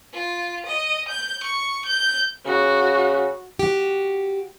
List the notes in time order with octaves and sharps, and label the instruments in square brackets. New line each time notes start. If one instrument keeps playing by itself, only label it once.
[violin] F4
D#5
G6
C#6
G6
[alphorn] C#3 [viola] F#4
[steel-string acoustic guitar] F#4 G4